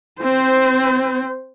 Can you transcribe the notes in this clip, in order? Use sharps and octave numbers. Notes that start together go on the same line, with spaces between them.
C4 C5